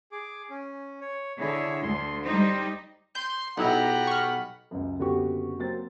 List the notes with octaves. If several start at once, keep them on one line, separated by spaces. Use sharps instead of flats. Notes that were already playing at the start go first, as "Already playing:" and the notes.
G#4 D6
C#4
C#5
D3 E4 G#4 C#5
D2 C6
G3 D#4 C5
C6 G6
B1 D#4 E4 G4 F#5 A#5 B5
C#6 F6
C#2 F#2
F#1 D3 B3 F#4 G4 C#6
F#3 A#3 C4 A6